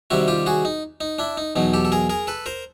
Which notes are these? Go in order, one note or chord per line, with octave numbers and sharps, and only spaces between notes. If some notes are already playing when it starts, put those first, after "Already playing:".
C3 D#3 G3 C4 E4 F#4
F4 G4
F#4 G#4
D#4
D#4
D4 E4
D#4
E2 B2 F#3 D#4
G4 A4
A4
G#4 A#4
G#4 A#4
A4 B4
A#4 C5